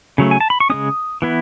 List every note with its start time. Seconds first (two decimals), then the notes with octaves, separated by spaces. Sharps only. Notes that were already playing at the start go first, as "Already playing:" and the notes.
0.18 C#3 F#3 A3
0.31 G#5
0.40 A5
0.50 B5
0.60 C#6
0.70 C#3 G#3 C#4 D#6
1.22 E3 B3 E4